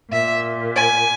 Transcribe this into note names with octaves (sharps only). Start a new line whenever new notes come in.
A#2 E5
G#5